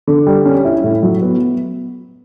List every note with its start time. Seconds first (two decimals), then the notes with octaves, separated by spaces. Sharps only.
0.07 D3
0.27 G3
0.45 C#4
0.65 E4
0.84 A2
1.03 F#3
1.22 B3